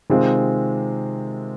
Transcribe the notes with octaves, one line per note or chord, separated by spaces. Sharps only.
C3 D#3 G#3 C4 F4